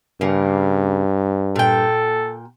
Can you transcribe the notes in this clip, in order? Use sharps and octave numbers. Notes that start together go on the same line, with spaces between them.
G2 C#3 A#3
A#2 A4 G5